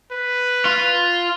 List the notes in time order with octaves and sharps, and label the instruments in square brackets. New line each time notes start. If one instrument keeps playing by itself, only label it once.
[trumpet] B4
[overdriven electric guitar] F4